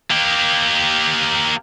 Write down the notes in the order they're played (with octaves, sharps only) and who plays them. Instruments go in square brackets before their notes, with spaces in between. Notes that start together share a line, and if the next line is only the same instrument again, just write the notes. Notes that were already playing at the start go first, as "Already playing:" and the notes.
[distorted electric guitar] A#3 G4